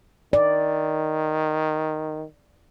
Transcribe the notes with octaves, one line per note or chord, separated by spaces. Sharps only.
D#3 D5